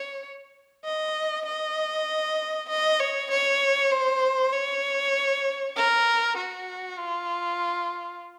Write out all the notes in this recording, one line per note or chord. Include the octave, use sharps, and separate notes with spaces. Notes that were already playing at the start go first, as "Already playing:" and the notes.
Already playing: C#5
D#5
D#5
D#5
C#5
C#5
C5
C#5
A#4
F#4
F4